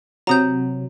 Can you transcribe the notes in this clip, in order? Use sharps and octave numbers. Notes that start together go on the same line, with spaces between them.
C3 F#3 A#5 D#6 G6